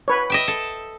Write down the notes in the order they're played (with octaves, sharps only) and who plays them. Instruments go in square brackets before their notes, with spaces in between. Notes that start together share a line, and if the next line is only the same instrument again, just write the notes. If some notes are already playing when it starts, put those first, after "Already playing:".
[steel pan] B4 C#5
[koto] D#5 E5 G5
A4